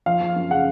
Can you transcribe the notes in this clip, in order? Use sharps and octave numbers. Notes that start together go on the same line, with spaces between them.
F3 F5
F3
F#2
C#3 F#5